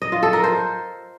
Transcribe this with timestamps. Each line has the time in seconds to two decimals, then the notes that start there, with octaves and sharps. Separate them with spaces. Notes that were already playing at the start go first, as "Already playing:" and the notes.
0.02 D#5
0.12 F4
0.23 A4
0.33 A#4
0.44 C5